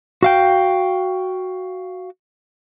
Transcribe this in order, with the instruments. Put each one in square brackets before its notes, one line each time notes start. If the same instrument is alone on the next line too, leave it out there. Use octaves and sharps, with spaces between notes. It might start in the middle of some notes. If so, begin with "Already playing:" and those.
[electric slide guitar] F#4 F5 G5